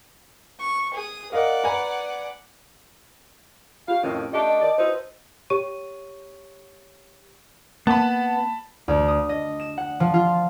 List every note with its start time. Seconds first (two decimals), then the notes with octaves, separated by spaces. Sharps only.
0.60 C#6
0.94 G#4 D#6
1.32 A#4 D5 D#5 F5 F#5
1.64 B4 G#5 A#5
3.88 F4 G4 F5
4.03 F2 A2 D#3 C#4
4.33 A3 D4 G4 D#5 A5
4.47 D#5
4.62 D#3 D5
4.78 D#4 E4 F#4 B4 C5
5.50 G4 C#5 C#6 D#7
7.87 A#3 B3 A5 B5
8.88 D2
9.08 D#6
9.29 D#5
9.60 E7
9.77 F#5
10.00 F3
10.14 F4